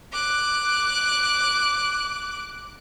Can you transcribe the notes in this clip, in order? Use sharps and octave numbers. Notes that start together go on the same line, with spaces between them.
D6 F#6